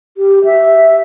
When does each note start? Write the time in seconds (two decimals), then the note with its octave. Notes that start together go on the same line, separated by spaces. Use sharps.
0.17 G4
0.45 E5